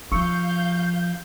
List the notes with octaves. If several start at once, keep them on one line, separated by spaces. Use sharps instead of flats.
F3 F5 C#6 E6 G6 C#7